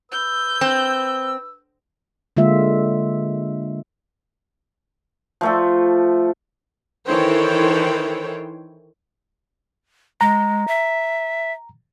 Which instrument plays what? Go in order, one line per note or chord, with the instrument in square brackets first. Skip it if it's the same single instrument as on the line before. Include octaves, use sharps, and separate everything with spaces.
[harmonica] B4 E6 [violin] G6
[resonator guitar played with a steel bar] C4
[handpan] D3 G#3 A#3 F4 E5
[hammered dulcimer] F3 A3 A4
[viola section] D#3 E3 A4 C5 C#5 G5
[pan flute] G#3 [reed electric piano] A#5
[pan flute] E5